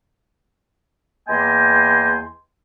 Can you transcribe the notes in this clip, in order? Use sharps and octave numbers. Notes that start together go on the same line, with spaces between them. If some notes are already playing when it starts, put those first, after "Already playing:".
E2 A#3 D#5 G5 G#5 C6